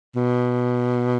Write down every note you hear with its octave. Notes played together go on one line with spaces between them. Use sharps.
B2